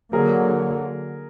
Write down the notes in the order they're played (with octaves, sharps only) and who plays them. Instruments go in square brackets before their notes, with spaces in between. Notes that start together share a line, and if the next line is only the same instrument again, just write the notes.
[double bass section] D3 F#3 A#3 [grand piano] G#4 A#4